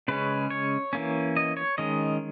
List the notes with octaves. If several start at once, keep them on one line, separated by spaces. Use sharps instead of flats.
C#3 G#3 C#4 B4
C#5
E3 A#3 C#4
D#5
C#5
D#3 G#3 C#4 D#5